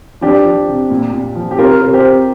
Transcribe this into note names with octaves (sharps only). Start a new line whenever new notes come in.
F3 D4 G4
F3
C3
A#2
A#2
F3
G4
C3 F4 A#4
C3 A#4
G4 C5
C3